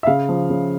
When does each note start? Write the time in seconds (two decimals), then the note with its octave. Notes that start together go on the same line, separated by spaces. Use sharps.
0.03 E5
0.07 C#3 F5
0.29 F3
0.50 C#3